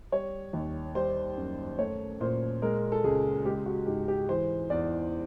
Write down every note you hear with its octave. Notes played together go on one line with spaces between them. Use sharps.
G3 C#5
D#2
G3 C5
F#2
A3 C#5
A#2 C5
G#3 A#4
A4
C#2 G#4
G#3 G4
F#4
G#2 G4
G4
E3 C5
E2 D5